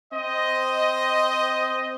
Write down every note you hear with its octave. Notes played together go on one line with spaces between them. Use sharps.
C4 C5 D#5